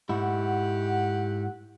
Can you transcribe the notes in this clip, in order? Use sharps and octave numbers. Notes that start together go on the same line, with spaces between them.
G#2 E4 G4 F#5